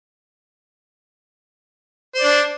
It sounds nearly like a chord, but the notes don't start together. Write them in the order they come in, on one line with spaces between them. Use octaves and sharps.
C5 D5 D4